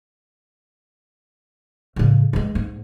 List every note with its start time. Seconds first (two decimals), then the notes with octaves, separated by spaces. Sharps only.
1.96 A2 C#3
2.33 E3 G#3
2.55 G#2